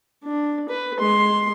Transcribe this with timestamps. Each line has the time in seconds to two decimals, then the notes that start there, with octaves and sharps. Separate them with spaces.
0.24 D4
0.69 B4
0.99 G#3 C6